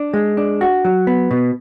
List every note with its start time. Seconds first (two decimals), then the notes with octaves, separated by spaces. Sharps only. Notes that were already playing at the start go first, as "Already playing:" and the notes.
Already playing: D4
0.14 G#3
0.37 D4
0.61 F#4
0.85 F#3
1.07 B3
1.31 B2